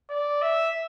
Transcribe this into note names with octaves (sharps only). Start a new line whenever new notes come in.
D5
E5